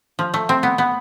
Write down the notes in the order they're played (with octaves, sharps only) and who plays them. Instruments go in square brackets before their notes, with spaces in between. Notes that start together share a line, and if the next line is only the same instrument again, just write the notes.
[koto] F3
A3
C4
B3
B3